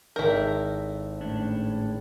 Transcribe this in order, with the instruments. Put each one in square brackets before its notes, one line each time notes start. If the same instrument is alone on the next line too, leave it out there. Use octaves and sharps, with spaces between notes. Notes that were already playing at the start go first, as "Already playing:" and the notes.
[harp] G#1 A4 G6 [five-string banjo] E4 A#4
[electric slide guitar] A2 C#4 D4